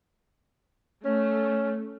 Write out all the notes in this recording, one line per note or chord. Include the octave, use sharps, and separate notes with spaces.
A3 C#4